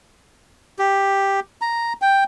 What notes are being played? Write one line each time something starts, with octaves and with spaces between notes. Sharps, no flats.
G4
A#5
G5